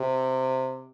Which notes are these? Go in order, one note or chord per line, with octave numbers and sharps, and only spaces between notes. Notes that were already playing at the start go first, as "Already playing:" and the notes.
Already playing: C3